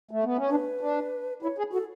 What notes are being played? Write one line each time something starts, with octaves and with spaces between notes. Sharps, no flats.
A3
B3
C#4
D4 B4
D4
E4 C#5
G#4
F#4 A4